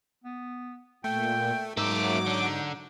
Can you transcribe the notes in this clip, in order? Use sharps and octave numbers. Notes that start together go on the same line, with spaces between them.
B3
A#2 A3 G5
G#2 F#3 A#3 D#4 E5 D6
D3